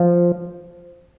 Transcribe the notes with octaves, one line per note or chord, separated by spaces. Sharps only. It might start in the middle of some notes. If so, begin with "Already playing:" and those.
Already playing: F3